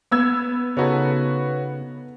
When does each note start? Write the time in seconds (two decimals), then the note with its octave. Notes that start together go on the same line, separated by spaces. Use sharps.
0.11 B3 E6 G#6
0.77 C#3 D#4 F#4 A4 B4 C#5